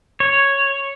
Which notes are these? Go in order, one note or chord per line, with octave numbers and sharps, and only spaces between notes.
C#5